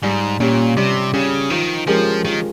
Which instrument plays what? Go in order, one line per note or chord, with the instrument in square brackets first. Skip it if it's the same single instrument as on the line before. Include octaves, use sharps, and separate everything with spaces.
[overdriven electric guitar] G#2 [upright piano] G3
[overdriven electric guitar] A#2 [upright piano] C#4 G4
[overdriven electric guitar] C3 [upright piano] G3
[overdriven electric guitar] C#3 [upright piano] C#4 G4
[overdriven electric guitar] D#3 [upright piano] F3
[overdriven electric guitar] F3 [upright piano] G#3 C#4 G4 A#4
[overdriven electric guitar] D#3 [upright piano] F3